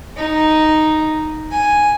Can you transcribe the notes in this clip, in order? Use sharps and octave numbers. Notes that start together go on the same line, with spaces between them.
D#4
G#5